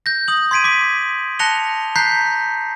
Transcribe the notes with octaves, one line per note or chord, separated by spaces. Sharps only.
G6 A#6
D#6 F#7
C6 G#6 B6 D7 D#7
D6 B6
A5 F#6 A#6 C#7 F7 G7
A#5 F#6 G6 B6 C7